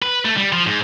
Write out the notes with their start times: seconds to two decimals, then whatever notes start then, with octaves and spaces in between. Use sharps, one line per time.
0.02 B4
0.25 A3
0.37 G3
0.52 F3
0.66 G#2